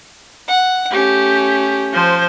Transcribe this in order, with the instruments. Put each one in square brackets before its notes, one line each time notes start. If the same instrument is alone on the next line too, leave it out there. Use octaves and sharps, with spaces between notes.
[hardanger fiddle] F#5
[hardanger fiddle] A3 C#4 [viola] G4
[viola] F3 C5